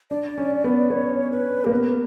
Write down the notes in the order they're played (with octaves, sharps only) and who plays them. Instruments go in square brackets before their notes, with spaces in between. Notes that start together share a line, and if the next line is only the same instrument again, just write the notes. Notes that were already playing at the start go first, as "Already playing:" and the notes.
[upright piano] D4 [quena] D5
[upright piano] C#4
B3
[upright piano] B3 [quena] C#5
[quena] B4
[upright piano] A#3 [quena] G4
[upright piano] B3 [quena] A#4